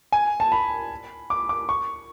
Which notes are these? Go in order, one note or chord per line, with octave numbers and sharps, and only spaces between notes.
G#5
A5
B5
D6
D6
C#6